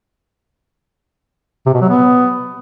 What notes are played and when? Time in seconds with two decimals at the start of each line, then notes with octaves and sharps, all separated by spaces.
1.66 C3
1.74 B2
1.82 F#3
1.89 B3